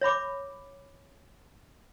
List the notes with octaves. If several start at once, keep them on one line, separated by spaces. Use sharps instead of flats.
C#5 E5 B5 D6